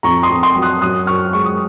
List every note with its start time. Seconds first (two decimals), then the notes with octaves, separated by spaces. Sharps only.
0.03 F2 A#5 C#6
0.23 C6 D#6
0.29 F2
0.43 C6 D#6
0.56 F#3
0.62 D#6 F#6
0.81 F#2 D#6 F#6
1.07 F#2 C#6 F6
1.33 G#3 C#6
1.46 D#6